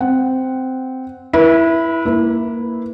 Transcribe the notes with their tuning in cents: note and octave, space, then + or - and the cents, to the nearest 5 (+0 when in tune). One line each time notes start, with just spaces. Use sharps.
C4 -10 F#5 +0
E4 +0 B4 -40
A#3 +0 E4 -5 B4 +0